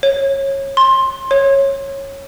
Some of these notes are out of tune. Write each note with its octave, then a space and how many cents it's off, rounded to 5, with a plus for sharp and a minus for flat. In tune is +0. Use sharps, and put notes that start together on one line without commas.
C#5 -20
C6 +20
C#5 -15